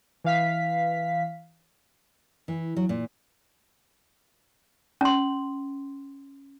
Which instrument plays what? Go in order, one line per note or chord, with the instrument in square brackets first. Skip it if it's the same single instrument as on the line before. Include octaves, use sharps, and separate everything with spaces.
[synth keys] E3 F5 B6
[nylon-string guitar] E3
F#3
A#2
[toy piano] C#4 C6